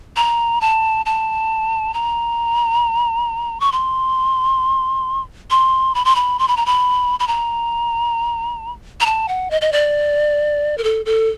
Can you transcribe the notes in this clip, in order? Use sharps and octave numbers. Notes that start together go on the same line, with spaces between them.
A#5
A5
A5
A#5
C#6
C6
C6
B5
C6
B5
C6
B5
A#5
B5
B5
A#5
A#5
A5
F#5
D#5
D#5
D5
A#4
A4
A4